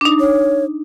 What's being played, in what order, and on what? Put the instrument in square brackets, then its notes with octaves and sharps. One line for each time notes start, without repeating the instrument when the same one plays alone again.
[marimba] D4 D#4
[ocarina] C#5